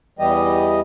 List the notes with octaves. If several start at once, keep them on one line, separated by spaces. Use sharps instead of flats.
E2 E3 G3 G4 D#5